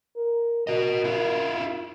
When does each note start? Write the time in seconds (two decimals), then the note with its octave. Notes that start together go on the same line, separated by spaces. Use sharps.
0.16 A#4
0.67 F#4 A#4 D#5
1.04 E4 F4